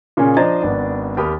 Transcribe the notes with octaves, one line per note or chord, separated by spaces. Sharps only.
A#2 C#3 A#3 C#4 G#4
F3 D4 C5 D#5 A#5 A6
G#1 B3 D4
D#2 G4 A#4 G5 B5 D#6